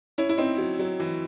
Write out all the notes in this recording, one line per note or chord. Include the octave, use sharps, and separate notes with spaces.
C#4 E4
E4
C4 D#4
F#3
F#3
E3